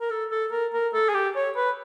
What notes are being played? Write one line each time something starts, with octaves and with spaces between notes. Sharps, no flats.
A#4
A4
A4
A#4
A#4
A4
G#4
G4
C#5
B4